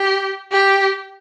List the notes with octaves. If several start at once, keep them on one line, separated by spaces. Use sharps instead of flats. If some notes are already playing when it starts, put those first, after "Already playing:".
Already playing: G4
G4